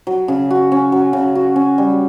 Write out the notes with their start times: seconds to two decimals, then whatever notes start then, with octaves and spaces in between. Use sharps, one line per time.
0.07 F#3
0.28 C#3
0.50 F#4
0.72 C#4
0.92 F#3
1.13 C#3
1.35 F#4
1.56 C#4
1.78 G3